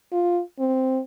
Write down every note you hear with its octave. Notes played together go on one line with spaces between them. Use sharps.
F4
C4